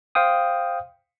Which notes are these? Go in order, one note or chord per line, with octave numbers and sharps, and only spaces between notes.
C5 F5 G5 D#6